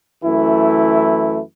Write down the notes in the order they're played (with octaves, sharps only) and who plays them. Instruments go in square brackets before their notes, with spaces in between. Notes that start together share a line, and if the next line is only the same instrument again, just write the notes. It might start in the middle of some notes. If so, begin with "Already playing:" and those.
[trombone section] F#2 E3 A3 E4